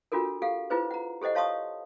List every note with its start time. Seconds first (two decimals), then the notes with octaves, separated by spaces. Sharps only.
0.12 D4 F4 F#4 A4 A#4
0.42 G4 A4 F5 F#5
0.70 E4 F4 G#4 B4 C5
0.91 F#5 A#5
1.22 G4 A4 C5 D#5 F#5
1.35 C#5 F5 A5 C6 C#6 D#6